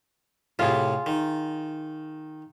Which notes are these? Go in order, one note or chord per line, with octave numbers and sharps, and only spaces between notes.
A2 C3 F4 G#4
D#3